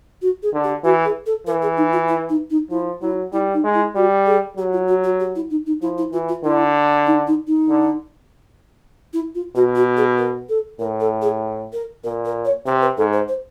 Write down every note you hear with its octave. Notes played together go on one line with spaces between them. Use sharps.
F#4
G#4
D3
G4
E3 F#4
G#4
A4
E3 A#4
G#4
D#4
F4
E4
D#4
D#4
F3 E4
F#3 E4
G3 E4
D#4
G#3
E4
G3 F#4
G#4
F#3 G4
F4
F#4
F#4
G4
E4
D#4
D#4
F3 E4
E4
E3 F4
F4
D3 E4
D#4
D#4
D#4
D3
E4
F4
B2 F#4
F#4
G#4
A#4
A4
A2 A#4
A4
G#4
A#4
A#2 A#4
A#4
C#5
C3 C5
B4
G#2 A4
C5
C5